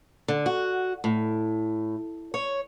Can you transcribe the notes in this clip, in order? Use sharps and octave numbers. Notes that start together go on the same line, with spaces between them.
D3
F#4
A2
C#5